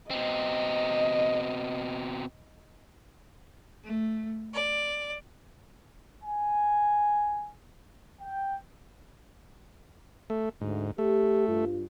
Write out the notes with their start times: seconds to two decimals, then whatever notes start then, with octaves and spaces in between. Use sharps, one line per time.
0.11 B2 C4 D#5
3.84 A3
4.54 D5
6.23 G#5
8.20 G5
10.30 A3
10.61 D2 G#2
10.98 A3 G4
11.47 G2 F4